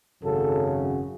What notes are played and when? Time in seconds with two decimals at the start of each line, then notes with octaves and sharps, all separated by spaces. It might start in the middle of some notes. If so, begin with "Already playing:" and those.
0.22 G#1 F#2 C#3 F#3 A4
0.81 F#4